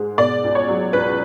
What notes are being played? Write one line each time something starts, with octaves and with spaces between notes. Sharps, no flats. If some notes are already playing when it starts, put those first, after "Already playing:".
Already playing: G#2 G#3
B2 D5
C#2
C#5
F#3
C#2 B4